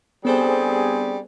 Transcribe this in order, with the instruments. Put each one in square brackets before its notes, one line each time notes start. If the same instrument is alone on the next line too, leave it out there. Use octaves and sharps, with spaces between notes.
[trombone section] G2 C4 G#4 [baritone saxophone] G3 [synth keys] B3 A4 C5